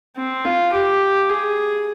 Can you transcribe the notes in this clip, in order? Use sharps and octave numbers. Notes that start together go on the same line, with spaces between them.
C4
F4
G4
G#4